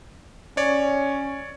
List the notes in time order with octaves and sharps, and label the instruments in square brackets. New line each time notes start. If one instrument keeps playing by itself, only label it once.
[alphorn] C#4 [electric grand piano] C#5 D5